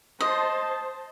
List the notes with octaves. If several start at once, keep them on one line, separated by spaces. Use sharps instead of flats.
C5 D#5 A5